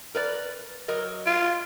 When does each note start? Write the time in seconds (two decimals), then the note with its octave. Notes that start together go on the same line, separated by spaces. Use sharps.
0.15 A#4 B4 D5
0.88 F#3 A#4 D#5
1.26 F4